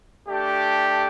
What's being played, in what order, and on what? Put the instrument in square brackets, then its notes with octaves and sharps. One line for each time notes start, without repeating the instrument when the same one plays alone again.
[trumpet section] A3 D4 G4